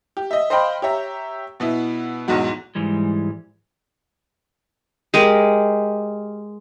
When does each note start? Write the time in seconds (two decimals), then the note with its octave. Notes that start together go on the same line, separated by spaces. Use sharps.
0.17 G4
0.31 D#5 E5
0.50 C5 D#5 F5 G5 B5
0.82 G4 C#5 E5 A#5
1.60 B2 B3 E4
2.28 B1 E2 G#2 F#4
2.75 G#2 E3 G3 G#3
5.14 G#3 G4 A#4